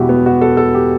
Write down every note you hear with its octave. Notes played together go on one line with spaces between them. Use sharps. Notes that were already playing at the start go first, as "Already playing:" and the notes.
Already playing: E1 E2 B2 G3 E4 F#4 G4
B3
F#4
A4
A4
G4